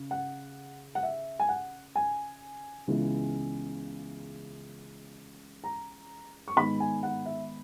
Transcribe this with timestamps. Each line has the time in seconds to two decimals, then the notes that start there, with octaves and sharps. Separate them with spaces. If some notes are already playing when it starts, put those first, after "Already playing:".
Already playing: C#3
0.11 F#5
0.95 F#5
1.03 E5
1.39 G#5
1.49 F#5
1.95 G#5
2.87 C#2 C#3 E3 G#3 B3
5.64 A#5
6.48 C#6
6.56 G#2 D#3 G#3 B3 B5
6.80 G#5
7.03 F#5
7.26 E5